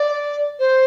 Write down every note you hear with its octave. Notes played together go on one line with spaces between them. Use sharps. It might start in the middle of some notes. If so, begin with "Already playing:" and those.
Already playing: D5
C5